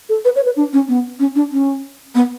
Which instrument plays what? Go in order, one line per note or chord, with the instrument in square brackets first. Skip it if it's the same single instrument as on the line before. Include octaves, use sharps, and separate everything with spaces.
[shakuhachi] A4
B4
C#5
B4
D4
C#4
B3
C#4
D4
C#4
B3